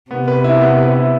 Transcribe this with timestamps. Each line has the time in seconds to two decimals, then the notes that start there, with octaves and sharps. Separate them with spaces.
0.11 C3 B3
0.28 B4
0.44 E4
0.61 B3
0.78 B4
0.95 E4